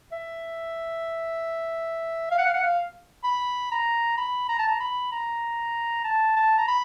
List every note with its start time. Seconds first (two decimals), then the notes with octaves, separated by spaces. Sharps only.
0.12 E5
2.31 F5
2.38 F#5
2.46 F5
2.54 F#5
2.63 F5
3.24 B5
3.72 A#5
4.17 B5
4.49 A#5
4.59 A5
4.68 A#5
4.80 B5
5.12 A#5
6.04 A5
6.37 A5
6.58 A#5
6.68 B5